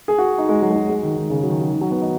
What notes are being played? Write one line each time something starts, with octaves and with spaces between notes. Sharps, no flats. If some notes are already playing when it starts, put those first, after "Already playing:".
G#4
F#4
D#4
G#3
F#3
G#3
F#3
G#3
D#3
D#3
C#3
F#3
D#3
F#3
D#3
F#3
B3
D#4